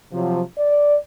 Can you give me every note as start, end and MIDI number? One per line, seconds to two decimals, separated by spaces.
0.12 0.42 48
0.12 0.42 53
0.12 0.42 54
0.58 0.95 74